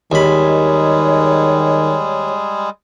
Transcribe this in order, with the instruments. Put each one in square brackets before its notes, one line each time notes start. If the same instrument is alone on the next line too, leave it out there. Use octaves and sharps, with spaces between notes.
[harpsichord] D#2 B5 [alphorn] D#3 [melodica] G3 G#3 G#4 [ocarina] C#5